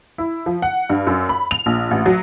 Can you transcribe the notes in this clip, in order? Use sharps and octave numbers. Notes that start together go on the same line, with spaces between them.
E4
F3
F#5
G2
F#2
B5
F7
A#1
A1
F#3